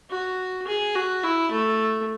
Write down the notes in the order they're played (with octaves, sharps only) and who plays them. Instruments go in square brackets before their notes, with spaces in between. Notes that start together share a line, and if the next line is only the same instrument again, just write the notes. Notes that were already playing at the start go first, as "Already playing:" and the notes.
[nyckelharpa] F#4
G#4
F#4
E4
A3